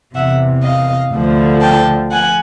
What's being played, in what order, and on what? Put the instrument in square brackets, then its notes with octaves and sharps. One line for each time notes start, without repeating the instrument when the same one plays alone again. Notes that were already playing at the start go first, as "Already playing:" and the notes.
[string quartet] E2 C3 E3 E5 F#5
D#5 F5
D2 D3 F3
G5 A5
F3 F#5 G#5